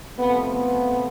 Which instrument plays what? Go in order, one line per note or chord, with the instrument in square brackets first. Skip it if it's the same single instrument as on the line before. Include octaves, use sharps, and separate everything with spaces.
[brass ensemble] C3 F3 A3 B3
B3